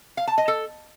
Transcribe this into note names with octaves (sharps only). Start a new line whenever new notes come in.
F5
A5
D#5
A4